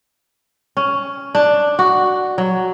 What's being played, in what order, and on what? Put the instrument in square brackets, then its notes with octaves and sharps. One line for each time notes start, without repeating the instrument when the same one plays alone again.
[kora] C#4
D4
F#4
F#3